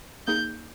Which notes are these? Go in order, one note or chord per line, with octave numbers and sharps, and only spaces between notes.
A#3 D#4 G#4 G6